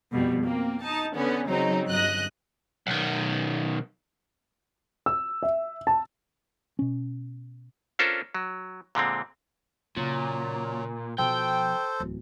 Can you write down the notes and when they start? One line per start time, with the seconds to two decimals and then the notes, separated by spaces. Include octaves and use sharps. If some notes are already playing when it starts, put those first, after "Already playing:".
0.12 F2 B2 G3
0.44 A#3 C4
0.82 D#4 A5
1.14 D3 B3 C#4
1.48 C#3 F#3 C4 D#4
1.89 G1 D#5 F#6
2.87 B1 D#3
5.06 E6
5.43 E5
5.87 A5
6.79 B2 C#4
7.99 C#4 D4 F4 A4 A#4 C5
8.35 F#3
8.95 A#2 D3 G#3 C4
9.96 A#2 C#3 F#3
11.18 B2 F3 A4 C5 G5
12.00 D1 E2